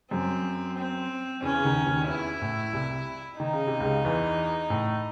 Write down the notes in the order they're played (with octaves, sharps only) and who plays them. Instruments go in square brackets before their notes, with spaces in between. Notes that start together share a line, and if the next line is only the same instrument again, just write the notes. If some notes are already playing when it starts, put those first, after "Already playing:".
[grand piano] F#2 F#3 [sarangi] C4
[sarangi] C4
[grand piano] E2 E3 [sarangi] C#4
[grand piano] C#3
D#2 D#3
D#2 D#3
[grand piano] E2 E3 [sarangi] E4
[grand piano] A2
C2 C3
[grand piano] D#3 [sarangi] D#4
[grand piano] C#3
C3
C#2 C#3
E2 E3
A2